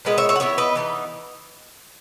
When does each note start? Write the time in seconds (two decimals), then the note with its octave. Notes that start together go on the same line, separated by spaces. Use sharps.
0.05 A#2 G#3 B3 B4 D#5
0.18 C#5 E5
0.29 C#5 E5
0.36 F#5
0.40 E3 B3 E4 C#5 E5
0.58 B4 D#5
0.75 E3 B3 D#4